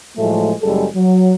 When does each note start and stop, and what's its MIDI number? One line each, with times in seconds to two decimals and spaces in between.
0.17 0.53 45
0.17 0.53 53
0.17 0.53 54
0.17 0.53 56
0.17 0.53 57
0.62 0.85 30
0.62 0.85 42
0.62 0.85 55
0.62 0.85 56
0.62 0.85 68
0.62 0.85 69
0.95 1.34 54